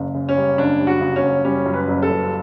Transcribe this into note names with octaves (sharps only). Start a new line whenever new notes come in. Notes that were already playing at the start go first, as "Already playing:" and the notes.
Already playing: F#1 C#3
C#3
C#4
G3
F#1 D4
G3
F#4
C#3
C#4
F#1
G3 C#4
F#2
B4
F#1
A4
F#2